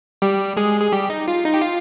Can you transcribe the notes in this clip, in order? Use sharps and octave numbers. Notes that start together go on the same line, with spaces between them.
G3 G4
G#3 G#4
G#4
G3 G4
D#4
F4
D#4
G4
F4